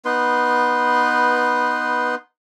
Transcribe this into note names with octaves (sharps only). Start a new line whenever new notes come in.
B3 D#4 B4 C6